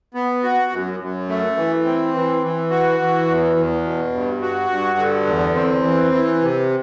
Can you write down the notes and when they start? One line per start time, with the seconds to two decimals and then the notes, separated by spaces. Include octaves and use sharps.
0.14 B3
0.43 F#4
0.72 F#2
1.00 F#2
1.29 A3
1.57 E3
1.85 C4
2.14 E3
2.42 E3
2.71 F#4
3.00 E3
3.28 E2
3.56 E2
3.85 B2
4.13 G2
4.42 F#4
4.70 G2
4.98 D3
5.27 E2
5.55 C4
5.84 E3
6.12 E3
6.41 C3